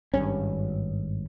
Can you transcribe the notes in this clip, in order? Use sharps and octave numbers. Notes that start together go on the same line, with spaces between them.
G#1 G2 C#4